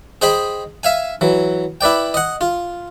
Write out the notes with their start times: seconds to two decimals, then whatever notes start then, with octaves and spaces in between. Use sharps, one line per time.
0.22 G#4 C5 D#5 G5 B5
0.83 E5 F5 G#5
1.21 E3 F#3
1.81 E4 B4 D5 G5
2.14 D#5 F#5
2.41 F4